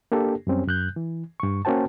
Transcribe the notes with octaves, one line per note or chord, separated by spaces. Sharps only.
A#3 D4 G4 A4
F#2 G3 C4 C#4
F#2 F#6 G6
E3
G2 C#6
A#3 C#4 F#4 C5 G5 A5